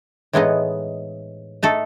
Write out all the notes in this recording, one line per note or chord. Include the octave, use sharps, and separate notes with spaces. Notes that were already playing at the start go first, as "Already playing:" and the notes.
A2 E3 G#3 B3 D#4
A3 D#4 A4